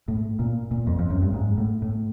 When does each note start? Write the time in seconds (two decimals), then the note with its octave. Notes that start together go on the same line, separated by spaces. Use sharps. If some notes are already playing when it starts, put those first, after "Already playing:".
0.08 A2
0.39 A#2
0.71 A#2
0.87 F2
0.99 F2
1.10 F#2
1.23 G2
1.34 G#2
1.58 A2
1.82 A2